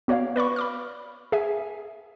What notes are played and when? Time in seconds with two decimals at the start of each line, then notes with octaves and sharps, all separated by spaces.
0.08 B3 F#4 C#5 D5 F5
0.36 B4 D5 B5 C#6
0.56 B5 D6 F6
1.32 G#4 E5 G#5